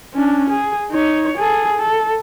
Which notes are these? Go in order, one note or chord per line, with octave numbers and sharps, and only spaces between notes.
C#4 D4
G#4
D#4 C#5
G#4 A4
A4